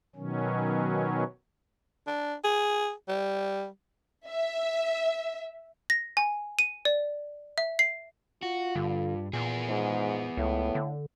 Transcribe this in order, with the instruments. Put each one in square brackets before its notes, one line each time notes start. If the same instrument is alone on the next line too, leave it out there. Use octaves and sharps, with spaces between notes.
[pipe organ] B2 D#3 F#3 C#4
[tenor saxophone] D4
G#4
G3
[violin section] E5
[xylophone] A#6
G#5
D#7
D5
E5
C7
[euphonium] F4 [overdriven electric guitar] F#4
[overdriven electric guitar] G2 [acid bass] D3
[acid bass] A#2 [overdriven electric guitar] B3 G#4
[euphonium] G#2
[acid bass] C#2 [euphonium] A2
[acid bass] D3